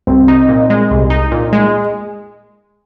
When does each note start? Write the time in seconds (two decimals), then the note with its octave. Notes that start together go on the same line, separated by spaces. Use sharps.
0.07 C2 C4
0.28 D#4
0.49 A#2
0.70 G#3
0.91 C2
1.10 D#4
1.32 A#2
1.53 G#3